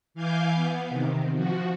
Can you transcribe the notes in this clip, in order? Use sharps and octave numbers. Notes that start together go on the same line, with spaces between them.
E3 F5 G#5 D6 G6
B3
C3 D#3
F3 F#4